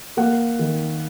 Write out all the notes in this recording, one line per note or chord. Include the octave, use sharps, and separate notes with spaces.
A#3 F#5
D#3